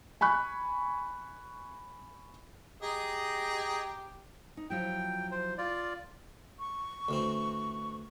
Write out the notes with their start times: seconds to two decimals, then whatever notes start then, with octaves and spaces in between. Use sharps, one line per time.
0.21 G#5 B5 C#6 F#6
2.83 G4 G#4 D#5 A#5
4.57 D#4
4.70 F3 F#3 E4 G5
5.32 C5
5.58 F4 D5
6.59 C#6
7.09 D2 E3 C4